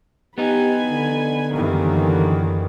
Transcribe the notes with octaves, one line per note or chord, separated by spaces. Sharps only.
B3 D#4 G4 G#5 B5
D3
F#2 D#3 E3 G3 A#3